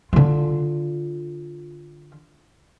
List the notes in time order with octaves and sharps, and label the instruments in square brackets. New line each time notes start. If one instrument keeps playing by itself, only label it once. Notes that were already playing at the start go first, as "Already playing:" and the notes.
[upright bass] D3 F4